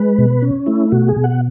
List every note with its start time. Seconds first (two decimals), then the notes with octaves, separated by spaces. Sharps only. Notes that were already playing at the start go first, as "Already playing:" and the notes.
Already playing: G#3 B4
0.18 B2
0.42 C#4
0.66 A3 E4
0.92 B2 F#4
1.08 G#4
1.16 B2
1.24 F#5